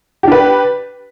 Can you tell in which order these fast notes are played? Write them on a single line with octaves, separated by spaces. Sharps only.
G4 D4 B4